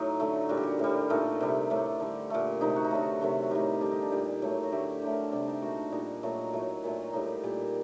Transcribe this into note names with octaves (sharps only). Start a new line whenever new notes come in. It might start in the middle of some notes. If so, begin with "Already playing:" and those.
Already playing: A2 F#3 D#4
D3 A3
A#2 G3 F#4
G4
F#4
A2 G3
A#2 A3 D#4
C3 G3
A2 A3 D4
D3 G3
A#2 A3
C3 D#3 A3 D#4
F#4
D#4
D3 F#3 A3 F#4
C3 D#3 F#3 A3
A2 G3 D#4
D3 G3 D4
D#4
D4
A#2 G3 D#4
A2 F#3 A3
F#4
D3 A3 G4
D3 F#3 A3 G4
A#4
A4
C3 G3 D4
D#4
A#2 A3 F#4
D4
A#2 G3 D#4
A#2 F#3 A3 F#4
A2 F#3 A3
A#2 F#3 A3
A2 G3 D#4
A#2 G3